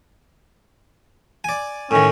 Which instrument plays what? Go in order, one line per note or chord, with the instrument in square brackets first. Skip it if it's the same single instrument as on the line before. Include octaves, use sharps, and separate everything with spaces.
[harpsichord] D5 G#5
[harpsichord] A2 D#3 [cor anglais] C#4